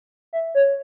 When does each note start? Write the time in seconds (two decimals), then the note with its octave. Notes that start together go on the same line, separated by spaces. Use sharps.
0.33 E5
0.55 C#5